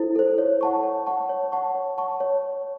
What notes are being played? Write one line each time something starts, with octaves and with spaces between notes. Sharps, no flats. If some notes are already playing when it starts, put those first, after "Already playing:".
Already playing: E4 A4 C5
A4 C5
C#5
F#5 A5 C#6
C#5
F#5 A5 C#6
C#5
F#5 A5 C#6
C#5
F#5 A5 C#6
C#5